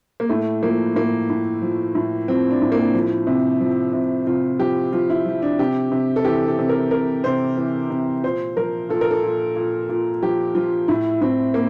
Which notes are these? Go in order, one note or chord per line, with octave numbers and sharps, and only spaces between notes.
A#3
A2 A3
F3 A#3
A2 A#3
A2
F3
A2
F3 C4
D4
A2
A#3
F3
C3
F3
C3
C3 F4
F3 G4
F3 F4
E4
F3
D4
C3 G4
C3
A4
E3 G4
A4
C3
A#4
C3 A#4
C3 C5
E3
C3
A#2 C5
F3 A#4
A#2 A4
A#4
A4
A#2
A#2
A#2
F3 G4
F3 F4
A2 E4
A2 C4
A#3